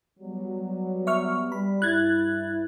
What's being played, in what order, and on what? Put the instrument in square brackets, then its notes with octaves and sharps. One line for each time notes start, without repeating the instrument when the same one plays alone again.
[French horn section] F#3 G3 B3
[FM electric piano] E5 C#6 F6
[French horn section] G3 [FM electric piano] B5
[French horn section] G2 E4 [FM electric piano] F#6 G#6 A6